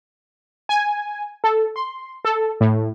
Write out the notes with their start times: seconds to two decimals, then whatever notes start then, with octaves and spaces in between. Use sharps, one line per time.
0.69 G#5
1.44 A4
1.76 C6
2.25 A4
2.61 A2